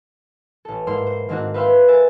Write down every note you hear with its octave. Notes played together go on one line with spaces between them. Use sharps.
A1 A4
G#2 A#3 E4 C5 C6
C5
G#2 D#3 A#3 C4 D4 F#4
B4 C5 E5 F5 G5 C6
A#4 C5 E5 G#5 A6